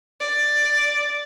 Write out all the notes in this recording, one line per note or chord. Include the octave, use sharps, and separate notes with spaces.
D5